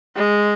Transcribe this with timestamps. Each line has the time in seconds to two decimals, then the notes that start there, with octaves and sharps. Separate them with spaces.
0.16 G#3